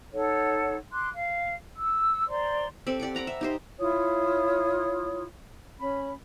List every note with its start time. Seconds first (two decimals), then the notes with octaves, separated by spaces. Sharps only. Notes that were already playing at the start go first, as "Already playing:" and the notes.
0.12 D#4 A4 C#5 F#5
0.92 C6 D6 F#6
1.14 F5
1.76 E6
2.28 C5 D5 A#5 C6
2.87 C4 G4 A4 D5
3.00 G4 D5 F#5 D6
3.15 F#5 A#5 B5 D6
3.27 E5
3.41 D#4 G4 C5
3.78 E4 F4 C#5 D#6
5.78 C#4 B5